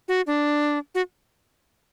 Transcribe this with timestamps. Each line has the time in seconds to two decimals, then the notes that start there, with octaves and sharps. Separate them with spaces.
0.08 F#4
0.27 D4
0.95 F#4